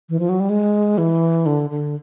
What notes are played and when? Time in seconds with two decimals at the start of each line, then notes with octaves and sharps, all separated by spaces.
0.09 E3
0.19 F3
0.29 F#3
0.40 G3
0.49 G#3
0.98 E3
1.46 D3
1.70 D3